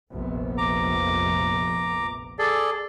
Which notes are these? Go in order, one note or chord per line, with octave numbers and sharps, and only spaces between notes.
F1 A#1 B3
A#5 D6
G#4 A4 D5